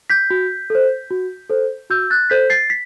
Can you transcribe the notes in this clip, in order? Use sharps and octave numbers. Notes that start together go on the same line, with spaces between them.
G6 B6
F#4
A4 C5
F#4
A4 C5
F#4 E6 G6
F#6 A6
A4 C5 G6 B6
A6 C7
B6